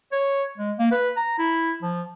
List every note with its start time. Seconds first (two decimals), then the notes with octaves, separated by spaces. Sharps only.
0.12 C#5
0.58 G#3
0.79 A#3
0.92 B4
1.17 A#5
1.39 E4
1.83 F3